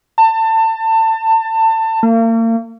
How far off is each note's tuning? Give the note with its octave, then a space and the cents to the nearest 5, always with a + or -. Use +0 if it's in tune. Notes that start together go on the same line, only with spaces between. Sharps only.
A5 +25
A#3 -40